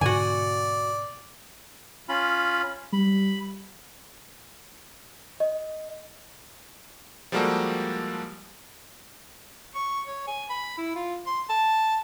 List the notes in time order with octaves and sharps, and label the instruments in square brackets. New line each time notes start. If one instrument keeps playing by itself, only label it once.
[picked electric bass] G#2 B2 D3 [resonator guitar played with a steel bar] F#4 G#5 [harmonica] D5
[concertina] C#4 F4 B5
[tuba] G3 [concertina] B5
[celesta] D#5
[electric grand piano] F3 G3 G#3 A#3 F#4 A4
[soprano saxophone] C#6
C#5
G#5
B5
E4
F4
C6
A5